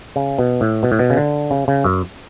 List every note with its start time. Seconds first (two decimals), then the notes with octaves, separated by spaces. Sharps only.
0.16 C#3
0.39 B2
0.61 A2
0.83 B2
0.92 A2
0.99 B2
1.10 C#3
1.17 D3
1.51 C#3
1.68 C#3
1.84 F#2